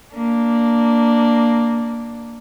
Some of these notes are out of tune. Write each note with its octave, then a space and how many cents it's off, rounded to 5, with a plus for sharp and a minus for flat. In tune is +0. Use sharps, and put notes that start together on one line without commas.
A#3 +0 D4 +0